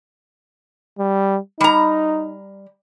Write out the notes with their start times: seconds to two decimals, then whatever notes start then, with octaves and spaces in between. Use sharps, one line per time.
0.99 G3
1.61 G3 D#4 A#5